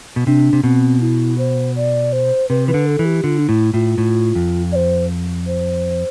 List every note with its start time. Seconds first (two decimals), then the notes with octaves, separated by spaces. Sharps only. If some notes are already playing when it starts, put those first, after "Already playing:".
0.16 B2
0.27 C3 D4
0.53 C3
0.64 B2 C4
1.01 E4
1.38 C5
1.76 D5
2.13 C5
2.50 C3 B4
2.68 E3 B4
2.74 D3
2.87 A4
2.99 E3
3.05 G4
3.24 D3 F4
3.39 D4
3.48 A2 E4
3.73 A2 F4
3.98 A2
4.35 F2
4.72 D5
4.76 C5
5.47 C5